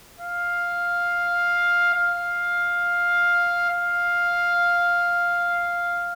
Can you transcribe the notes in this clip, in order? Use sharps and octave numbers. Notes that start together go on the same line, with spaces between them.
F5
F5
F5